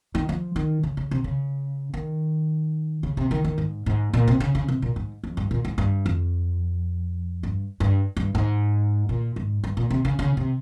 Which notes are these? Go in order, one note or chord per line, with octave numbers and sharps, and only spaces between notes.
D#3
F3
D#3
C#3
C#3
C3
C#3
D#3
C#3
C3
D#3
D#3
G#2
G#2
A#2
C3
C#3
C#3
C3
A#2
G#2
F2
G2
A#2
G#2
G2
F2
G2
G2
G2
G#2
A#2
G#2
G2
A#2
C3
C#3
C#3
C3